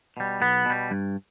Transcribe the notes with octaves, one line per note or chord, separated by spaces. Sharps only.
B2 G3
B1 B3
B2 G3
G2